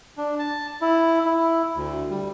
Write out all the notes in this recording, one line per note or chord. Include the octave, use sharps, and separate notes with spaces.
D4
A5
E4
E4
D2
G3